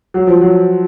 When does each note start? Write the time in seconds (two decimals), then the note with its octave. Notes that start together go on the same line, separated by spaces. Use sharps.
0.14 F#3
0.27 F3
0.41 F#3